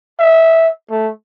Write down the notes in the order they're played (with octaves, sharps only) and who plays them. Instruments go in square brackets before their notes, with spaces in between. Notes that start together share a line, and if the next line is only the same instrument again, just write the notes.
[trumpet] E5
A3